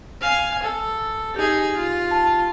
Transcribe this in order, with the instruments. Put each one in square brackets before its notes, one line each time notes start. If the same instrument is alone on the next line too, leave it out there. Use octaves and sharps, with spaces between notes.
[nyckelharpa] F5 G#5
A4
[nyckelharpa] D#4 G#4 [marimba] G4
[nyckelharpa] F4
[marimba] A5